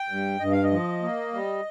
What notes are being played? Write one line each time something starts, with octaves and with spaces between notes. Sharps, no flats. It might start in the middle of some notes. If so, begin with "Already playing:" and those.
Already playing: G5
G2
G2 D#5
F5
D#5
F3
A#3
G3